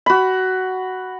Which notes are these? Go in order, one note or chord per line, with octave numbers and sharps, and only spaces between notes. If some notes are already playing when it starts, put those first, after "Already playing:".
F#4 B5